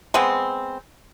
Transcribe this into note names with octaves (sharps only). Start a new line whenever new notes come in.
G#3 B3 C4